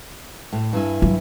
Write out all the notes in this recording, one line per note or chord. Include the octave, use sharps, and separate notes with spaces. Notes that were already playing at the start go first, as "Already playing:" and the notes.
A2
G2 E4 G#5
F#3